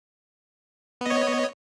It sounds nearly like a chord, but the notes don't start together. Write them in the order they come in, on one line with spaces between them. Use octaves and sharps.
B3 D#5 C#5